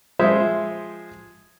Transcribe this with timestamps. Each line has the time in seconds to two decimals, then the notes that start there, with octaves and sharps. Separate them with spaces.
0.19 F3 G#3 C5 E5